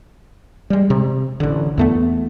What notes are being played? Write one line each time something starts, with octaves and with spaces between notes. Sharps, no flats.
G3 G#3
C3
A1 D3
E2 A3 B3